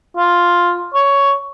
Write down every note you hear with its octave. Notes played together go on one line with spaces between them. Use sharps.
F4
C#5